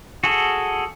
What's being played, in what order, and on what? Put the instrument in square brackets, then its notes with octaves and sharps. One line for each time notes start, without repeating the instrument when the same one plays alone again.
[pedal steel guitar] F#4 G#4 A4